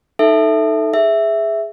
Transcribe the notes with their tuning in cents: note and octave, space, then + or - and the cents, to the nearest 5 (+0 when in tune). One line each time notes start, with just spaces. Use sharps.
D#4 +0 A4 +0 E5 +0
G#4 +0 E5 +0